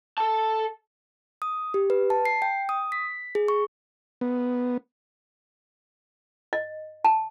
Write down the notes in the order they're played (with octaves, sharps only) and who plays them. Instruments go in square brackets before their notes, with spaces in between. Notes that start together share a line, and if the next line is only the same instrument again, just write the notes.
[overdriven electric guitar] A4 A5
[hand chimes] D#6
G4
B4
A5
C7
G5
D#6
B6
G#4
C#6
[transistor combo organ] B3
[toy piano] D#5
A5